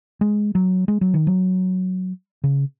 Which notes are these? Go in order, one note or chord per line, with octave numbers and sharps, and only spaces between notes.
G#3
F#3
G#3
F#3
D#3
F#3
C#3